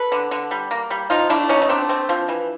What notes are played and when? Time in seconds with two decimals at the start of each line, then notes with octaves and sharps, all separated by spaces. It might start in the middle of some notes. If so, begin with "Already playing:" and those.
Already playing: A4 B4
0.12 D3
0.31 D3
0.51 G3
0.71 A#3
0.91 G3
1.10 F3 D#4 F4
1.30 A3 D4 E4
1.49 F3 C#4 D#4
1.62 D#4
1.69 A3 C4 D4
1.89 C4
2.09 F3
2.28 E3